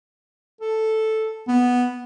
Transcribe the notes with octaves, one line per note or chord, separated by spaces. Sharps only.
A4
B3